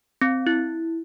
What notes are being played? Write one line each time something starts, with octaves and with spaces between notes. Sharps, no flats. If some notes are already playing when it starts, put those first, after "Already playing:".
C4
E4